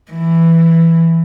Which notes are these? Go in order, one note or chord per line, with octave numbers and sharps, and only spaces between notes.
E3